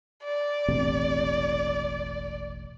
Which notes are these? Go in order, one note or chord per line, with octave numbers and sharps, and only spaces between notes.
D5
E1 A1 C3